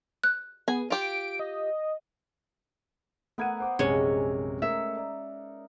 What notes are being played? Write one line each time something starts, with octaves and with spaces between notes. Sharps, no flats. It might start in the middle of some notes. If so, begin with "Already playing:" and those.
F#6
B3 G#4 G#5
F4 G4 D7
D#5
A3 B3 A#4 F#5 G#6 D#7
C5 D6 D#6
A#1 F#2 C3 G#3 C#4 A#4 C#5
A3 D#4 A#4 C#5 E5
D5 A#5